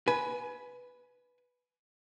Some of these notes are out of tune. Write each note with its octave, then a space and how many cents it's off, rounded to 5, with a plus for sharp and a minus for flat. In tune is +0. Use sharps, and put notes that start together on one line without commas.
B4 +0 G#5 +20